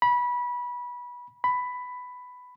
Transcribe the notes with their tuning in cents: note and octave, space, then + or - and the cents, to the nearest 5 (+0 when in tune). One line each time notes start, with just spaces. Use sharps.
B5 -20
B5 +10